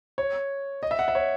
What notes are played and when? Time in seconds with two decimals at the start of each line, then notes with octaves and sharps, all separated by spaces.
0.18 C#5
0.83 D#5
0.91 E5
0.99 F#5
1.08 E5
1.15 C#5